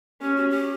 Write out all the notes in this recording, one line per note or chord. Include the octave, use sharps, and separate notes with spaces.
C#4 G4
F#4
G4